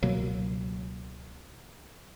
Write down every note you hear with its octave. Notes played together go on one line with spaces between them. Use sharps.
C#2 B2 F#3 A#3